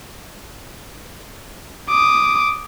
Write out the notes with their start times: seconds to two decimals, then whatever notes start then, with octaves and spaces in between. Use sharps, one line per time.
1.90 D6 D#6